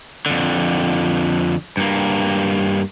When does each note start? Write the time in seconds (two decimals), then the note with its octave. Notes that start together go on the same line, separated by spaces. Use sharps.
0.26 F2 D3
1.77 G2 A#3